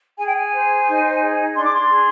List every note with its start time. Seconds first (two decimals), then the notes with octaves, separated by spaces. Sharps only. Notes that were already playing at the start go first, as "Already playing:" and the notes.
0.17 G#4 G#5
0.27 G5
0.36 G#5
0.52 C5
0.86 D#4
1.20 G#4
1.55 D4 C6
1.64 D6
1.74 C6
1.89 G#4